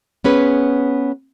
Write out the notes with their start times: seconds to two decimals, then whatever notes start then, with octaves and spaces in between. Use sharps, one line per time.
0.24 B3 C#4 G#4 B4